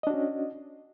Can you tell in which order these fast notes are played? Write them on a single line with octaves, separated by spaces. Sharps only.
D#5 D4 F#4 C#4